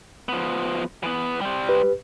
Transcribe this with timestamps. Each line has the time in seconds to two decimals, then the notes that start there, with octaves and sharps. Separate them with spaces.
0.29 F3 B3
1.03 E3 B3
1.41 G3 C5
1.69 G4 B4